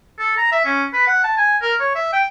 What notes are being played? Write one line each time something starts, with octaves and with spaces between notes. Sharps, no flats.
A4
A#5
E5
C#4
B4
F#5
A5
G#5
A#4
C#5
E5
G5